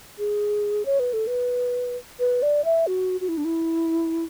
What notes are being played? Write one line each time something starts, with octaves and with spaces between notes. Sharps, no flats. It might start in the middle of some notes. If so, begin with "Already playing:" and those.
G#4
C#5
B4
A4
B4
B4
D5
E5
F#4
F#4
E4
D4
E4